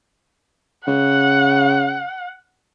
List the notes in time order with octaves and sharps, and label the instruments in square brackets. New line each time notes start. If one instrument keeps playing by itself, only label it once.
[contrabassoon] C#3 [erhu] F#5